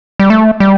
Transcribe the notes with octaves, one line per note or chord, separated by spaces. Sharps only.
G3
A3
G3